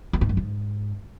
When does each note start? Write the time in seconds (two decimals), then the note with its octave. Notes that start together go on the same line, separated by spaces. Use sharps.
0.13 E2
0.21 G#2
0.29 F#2
0.37 G#2